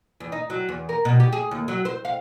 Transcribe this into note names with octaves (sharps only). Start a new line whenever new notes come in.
E2
D#4
F#3
E2
A#4
B2
G4
G#4
D#2
F#3
C5
F5